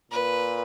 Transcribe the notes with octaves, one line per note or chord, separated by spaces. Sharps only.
A#2 B4